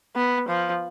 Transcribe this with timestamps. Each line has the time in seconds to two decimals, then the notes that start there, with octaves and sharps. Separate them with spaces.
0.16 B3
0.48 F3